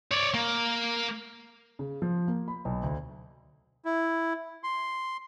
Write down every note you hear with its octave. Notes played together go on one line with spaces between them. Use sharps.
C#5 D5
A#3
C#3
F3
A#3
B5
B1
D2
E4
C6